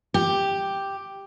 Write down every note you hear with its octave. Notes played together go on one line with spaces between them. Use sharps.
G4